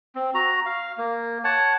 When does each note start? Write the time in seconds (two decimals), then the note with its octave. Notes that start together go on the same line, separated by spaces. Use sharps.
0.15 C4
0.34 F#4 A#5
0.66 F5
0.98 A#3
1.44 C#5 F#5 A5